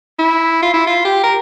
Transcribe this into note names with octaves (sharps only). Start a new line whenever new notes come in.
E4
F4
E4
F4
G4
A#4